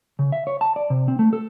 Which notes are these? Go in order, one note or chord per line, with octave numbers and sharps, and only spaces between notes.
C#3
E5
C#5
A5
D5
C3
C4
A3
A4